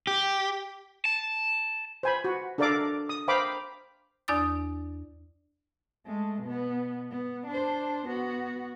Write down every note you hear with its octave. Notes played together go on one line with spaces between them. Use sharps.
G4
A5
C5 G#5 B5
F#4
D4 A4 A#4 D5 F5 D6
D#6
A#4 C5 F5 G5 B5 D6
E2 D4 D5 D#6 E6 A6
G#3 A3
B2 B3
B3
D4 C5
B3 F#4